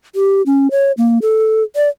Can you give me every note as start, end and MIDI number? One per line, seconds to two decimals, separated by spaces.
0.15 0.42 67
0.46 0.68 61
0.71 0.92 73
0.98 1.18 58
1.22 1.63 69
1.76 1.89 74